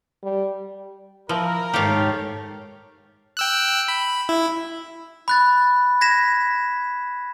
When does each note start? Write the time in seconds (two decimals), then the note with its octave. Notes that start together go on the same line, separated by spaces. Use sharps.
0.23 G3
1.29 F3 E4 A#4
1.74 G#2 D#3 A3 G4 C#5 F5
3.37 G5 E6 F#6
3.88 B5
4.29 E4
5.28 B5 F#6 A6
6.01 G#6 A#6 B6 E7